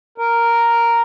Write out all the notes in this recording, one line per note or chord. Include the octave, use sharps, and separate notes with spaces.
A#4